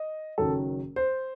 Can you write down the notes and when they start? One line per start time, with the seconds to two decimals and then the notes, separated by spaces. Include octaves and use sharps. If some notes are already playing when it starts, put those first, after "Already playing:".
Already playing: D#5
0.38 F#1 F#2 D#3 F#3 A4
0.96 C5